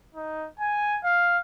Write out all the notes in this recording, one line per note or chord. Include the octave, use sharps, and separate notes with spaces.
D#4
G#5
F5